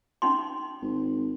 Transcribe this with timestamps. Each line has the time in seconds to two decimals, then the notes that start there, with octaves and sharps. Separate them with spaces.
0.22 C#4 D#4 C6
0.82 G#1